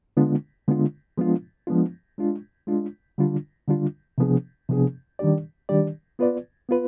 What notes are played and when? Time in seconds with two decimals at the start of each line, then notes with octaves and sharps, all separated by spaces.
0.17 D3 G#3 B3 D4 F4
0.68 D3 G#3 B3 D4 F4
1.18 F3 G#3 B3 D4 F4
1.67 F3 G#3 B3 D4 F4
2.18 G#3 D4 F4
2.67 G#3 D4 F4
3.18 D3 G3 D4 F4
3.68 D3 G3 D4 F4
4.18 C3 F3 B3 D4 G#4
4.69 C3 F3 B3 D4 G#4
5.19 D#3 G3 D4 G4 D5
5.69 D#3 G3 D4 G4 D5
6.19 B3 F4 B4 D5
6.69 B3 F4 B4